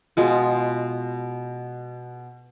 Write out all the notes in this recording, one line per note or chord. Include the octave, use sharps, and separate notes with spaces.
B2 G#3 F4